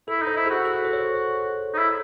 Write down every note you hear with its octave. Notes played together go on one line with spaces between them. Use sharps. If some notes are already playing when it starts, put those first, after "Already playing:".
E4 A4
D#4
C5
E4
F#4 G#4
A4
C5
C#5
D#4
E4